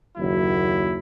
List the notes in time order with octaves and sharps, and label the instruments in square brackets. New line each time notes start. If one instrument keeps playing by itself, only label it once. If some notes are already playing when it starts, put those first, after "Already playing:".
[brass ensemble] F#1 D#2 F#3 E4